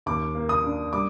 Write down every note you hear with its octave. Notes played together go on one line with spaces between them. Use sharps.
D#2 D6
A#3
D#6
D4
G3 D6